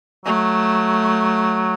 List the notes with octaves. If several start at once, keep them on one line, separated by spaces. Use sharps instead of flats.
F#3 A3